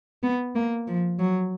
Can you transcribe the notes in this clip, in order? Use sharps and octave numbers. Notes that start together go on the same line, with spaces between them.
B3
A#3
F3
F#3